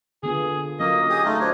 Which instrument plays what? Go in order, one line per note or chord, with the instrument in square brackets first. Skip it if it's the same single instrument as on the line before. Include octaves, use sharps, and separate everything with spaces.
[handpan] D3 B3 F4 [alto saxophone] G#4
[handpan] F#3 C#4 F4 [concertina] A#3 [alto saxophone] D#5
[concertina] G4 G#4 D#6
A3 D#4 F4
[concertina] D4 C#5 [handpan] F#4 C5